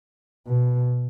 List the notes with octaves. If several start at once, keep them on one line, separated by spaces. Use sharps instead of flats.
B2